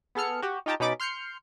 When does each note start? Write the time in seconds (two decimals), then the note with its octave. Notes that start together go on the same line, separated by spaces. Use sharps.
0.15 B3 G#4 A4 F6 C#7
0.42 F#4 G4
0.66 D#4 F4 G4 G5 A5 A#5
0.80 B2 C#4 D#4 B5 D6 A6
1.00 C6 F6 G6 C7 C#7